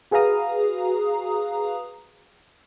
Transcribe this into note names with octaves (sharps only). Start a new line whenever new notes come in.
F#4 G#4 B4 F5 A#5 D#6